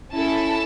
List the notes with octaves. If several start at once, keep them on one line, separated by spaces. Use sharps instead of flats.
C#4 E4 A4 A5